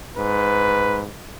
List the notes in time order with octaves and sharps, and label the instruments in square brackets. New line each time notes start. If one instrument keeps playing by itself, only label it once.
[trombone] G#2 [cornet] B4